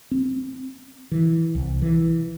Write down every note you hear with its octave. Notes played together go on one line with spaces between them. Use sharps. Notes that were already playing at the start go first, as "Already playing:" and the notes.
C4
E3
C2
E3